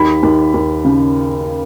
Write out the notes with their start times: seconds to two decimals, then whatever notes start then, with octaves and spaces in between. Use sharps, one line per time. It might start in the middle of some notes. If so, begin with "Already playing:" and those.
Already playing: D#2 B5
0.23 D#2
0.54 D#2
0.85 C#3